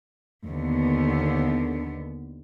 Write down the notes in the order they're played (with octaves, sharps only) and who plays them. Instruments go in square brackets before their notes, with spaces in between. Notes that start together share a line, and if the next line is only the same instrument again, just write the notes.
[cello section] D#2 D3 B3